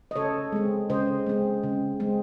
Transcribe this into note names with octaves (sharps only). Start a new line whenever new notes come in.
D#5
C#3 A4 C#5
G#3 C4
C#3 C5 D#5
G#3 C4
C#3
G#3 C4